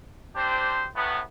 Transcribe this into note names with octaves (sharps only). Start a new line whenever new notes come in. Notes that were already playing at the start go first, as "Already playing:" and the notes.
C4 D4 G4 C5
A2 F#3 B3